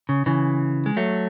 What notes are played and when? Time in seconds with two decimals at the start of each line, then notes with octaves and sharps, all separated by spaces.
0.09 C#3
0.26 C#3 E3
0.86 G#3
0.97 F#3 A3